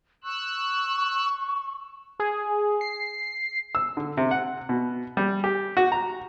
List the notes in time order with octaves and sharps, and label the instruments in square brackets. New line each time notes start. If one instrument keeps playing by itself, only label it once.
[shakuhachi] C#6 [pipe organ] E6 F#6
[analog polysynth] G#4
C7
[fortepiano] E6
D3
C3
F#5
B2
G3
G4
F#4
A#5